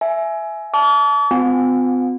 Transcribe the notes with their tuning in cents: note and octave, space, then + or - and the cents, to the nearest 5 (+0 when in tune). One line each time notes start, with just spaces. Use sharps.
E5 +5 G#5 +20
A5 -25 D6 -45
C4 -45 F4 +40 G#5 -30